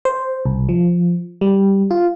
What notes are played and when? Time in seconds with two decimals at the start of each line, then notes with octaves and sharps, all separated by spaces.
0.05 C5
0.45 C2
0.69 F3
1.41 G3
1.91 F4